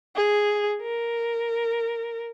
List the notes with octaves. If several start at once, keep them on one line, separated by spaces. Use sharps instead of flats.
G#4
A#4